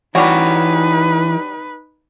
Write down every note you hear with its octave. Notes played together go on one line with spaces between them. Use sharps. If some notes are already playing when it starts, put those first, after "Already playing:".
E3 G3 C#4 D#4 F#4 B4 C#5